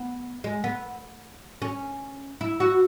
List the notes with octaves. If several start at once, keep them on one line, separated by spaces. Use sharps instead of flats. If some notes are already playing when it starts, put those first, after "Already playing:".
Already playing: B3
G#3
B3
C#4
E4
F#4